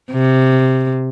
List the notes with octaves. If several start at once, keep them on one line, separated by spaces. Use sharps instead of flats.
C3